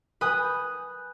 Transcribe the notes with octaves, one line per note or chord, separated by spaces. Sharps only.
B4 G#5 D#6 F#6 G6